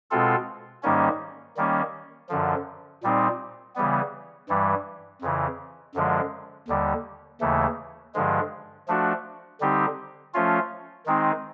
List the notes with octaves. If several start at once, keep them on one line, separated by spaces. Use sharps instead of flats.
B2 G#3 C4 F4 A4
G#2 D#3 G3 A#3 C#4
D#3 G3 A#3 C#4
F#2 D3 F3
A#2 G3 C4 D#4
C#3 E3 G3 B3
G2 E3 G3
F2 C#3 E3
F#2 D3 F3 G#3
D#2 D3 G3
D#2 C#3 E3 A3
G2 D3 F3 G#3
F3 A3 D4 F#4
D3 G3 C4 D#4 G4
F3 A3 C#4 F4
D#3 G#3 C4 D#4